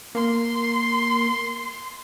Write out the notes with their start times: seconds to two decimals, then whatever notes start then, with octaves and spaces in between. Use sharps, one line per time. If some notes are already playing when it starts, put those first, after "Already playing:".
0.15 A#3 C6